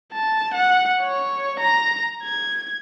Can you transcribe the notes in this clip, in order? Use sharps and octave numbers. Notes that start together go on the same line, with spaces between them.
A5
F#5
C#5
A#5
G#6